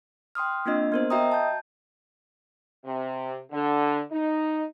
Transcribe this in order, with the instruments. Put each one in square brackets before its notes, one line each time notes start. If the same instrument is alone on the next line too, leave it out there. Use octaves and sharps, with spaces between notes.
[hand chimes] G5 C6 D#6 F6
A#3 C4 D4 F4 D#5
B3 A#4 C5
F#4 D#5 E5 G5 A#5 D#6
A5 G6
[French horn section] C3
D3
D#4